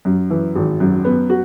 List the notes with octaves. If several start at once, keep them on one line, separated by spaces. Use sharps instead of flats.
F#2
E3
G#1
F#2
B3
F#4